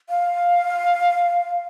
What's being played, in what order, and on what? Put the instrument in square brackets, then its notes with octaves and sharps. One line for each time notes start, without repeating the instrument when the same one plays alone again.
[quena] F5